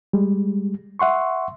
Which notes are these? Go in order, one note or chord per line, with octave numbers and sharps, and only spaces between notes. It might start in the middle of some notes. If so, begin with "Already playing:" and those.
G3 G#3
E5 F#5 C6 C#6